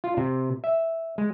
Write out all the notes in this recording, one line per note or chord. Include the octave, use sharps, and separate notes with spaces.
F4
C3
E5
G#3